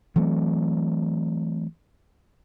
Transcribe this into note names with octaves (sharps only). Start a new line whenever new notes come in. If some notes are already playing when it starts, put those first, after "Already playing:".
E3 F#3 A3 C4